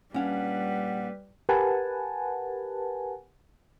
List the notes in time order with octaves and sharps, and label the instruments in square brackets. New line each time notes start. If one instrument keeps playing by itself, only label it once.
[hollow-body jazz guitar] A#2 C#4 D4 [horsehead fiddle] G3 B4 [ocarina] F#5
[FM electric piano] G4 A#4 B4 F#5 G#5 A5